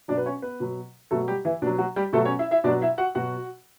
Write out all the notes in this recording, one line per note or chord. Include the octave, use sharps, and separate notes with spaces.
B2 F#3 D4 D5
B4
C#4 C#5
B3 B4
B2 F#3
B2 F#3 A3 A4
G3 G4
E3 E4
B2 F#3 D4
F#3 F#4
G3 G4
B2 F#3 A3 A4
C#4 C#5
E4 E5
E4 E5
B2 F#3 D4 D5
E4 E5
F#4 F#5
B2 F#3 F#4 F#5